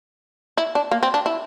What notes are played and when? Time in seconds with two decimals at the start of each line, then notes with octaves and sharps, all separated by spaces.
0.58 E4
0.75 D4
0.91 A#3
1.03 C4
1.14 D4
1.26 E4